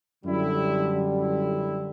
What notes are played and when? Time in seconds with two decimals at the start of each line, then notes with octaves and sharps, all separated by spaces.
0.25 F#2 D3 G3 E4
1.14 E4